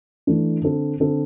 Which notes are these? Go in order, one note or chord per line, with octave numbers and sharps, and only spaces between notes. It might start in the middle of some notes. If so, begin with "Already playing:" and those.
E3 A3 D4
D3 C4 A4
D3 C4 A4